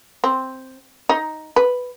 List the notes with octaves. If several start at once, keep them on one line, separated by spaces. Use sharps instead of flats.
C4
D#4
B4